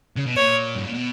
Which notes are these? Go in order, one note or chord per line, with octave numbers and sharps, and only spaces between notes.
C#3
B2
A#2 C#5
G2
A#2
B2